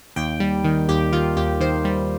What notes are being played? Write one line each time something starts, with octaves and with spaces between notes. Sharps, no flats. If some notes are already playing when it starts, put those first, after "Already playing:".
D#2 G5
G3
D#3
D#2 G4
D#3 F4
D#2 G4
D#3 C5
G3